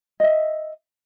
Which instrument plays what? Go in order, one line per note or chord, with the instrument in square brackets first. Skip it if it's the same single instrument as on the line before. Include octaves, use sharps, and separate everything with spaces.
[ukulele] D#5 E5